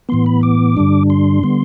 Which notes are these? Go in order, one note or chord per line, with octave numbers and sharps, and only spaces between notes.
A2 E3 B3 C6
B5
D6
G2 D3 G3 D4
C6
D3 G3 B3